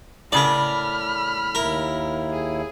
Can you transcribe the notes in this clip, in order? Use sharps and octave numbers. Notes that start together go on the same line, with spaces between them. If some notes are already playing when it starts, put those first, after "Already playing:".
A2 C#3 A#4 D5 B5 F6
D#2 E4 A#4
G#4